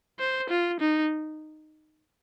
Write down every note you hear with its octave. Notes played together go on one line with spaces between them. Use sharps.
C5
F4
D#4